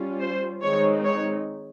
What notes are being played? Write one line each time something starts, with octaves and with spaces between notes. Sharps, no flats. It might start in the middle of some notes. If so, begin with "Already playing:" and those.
Already playing: G3 C#4 F4
C5
D#3 G#3 C4 D#4 C#5
C#5